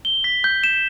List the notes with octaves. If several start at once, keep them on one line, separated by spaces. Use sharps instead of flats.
G7
B6
G6
E7